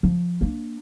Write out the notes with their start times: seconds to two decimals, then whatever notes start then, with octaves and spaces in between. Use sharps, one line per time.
0.03 F3
0.41 A#3 D4